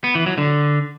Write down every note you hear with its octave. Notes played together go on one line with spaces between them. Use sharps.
B3
E3
F#3
D3